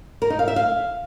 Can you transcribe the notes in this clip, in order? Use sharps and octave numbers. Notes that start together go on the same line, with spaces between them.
A#4
D#4
F5
E5
F5